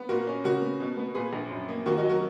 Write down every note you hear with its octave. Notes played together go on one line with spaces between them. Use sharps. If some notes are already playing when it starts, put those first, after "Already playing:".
Already playing: B3
A#2 F#4 A#4
C#4
C#3 F#4 A#4
B3
B2
B3
A#2 G#4 B4
A#1
F#2
A#3
D#2 F#4 A#4
D#4 F#4
F#3
F#4 A#4